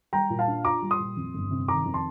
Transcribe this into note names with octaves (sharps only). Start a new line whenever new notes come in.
G3 G5 A#5
A#2
F5 A5
D4
F4 A#5 D6
G3
C6 D#6
A#2
F2
G1
C3
D#3 A#5 D6
F2
A5 C6